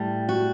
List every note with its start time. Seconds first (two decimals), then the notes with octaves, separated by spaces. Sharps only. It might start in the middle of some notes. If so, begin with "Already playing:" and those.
Already playing: A2 G3
0.29 F#4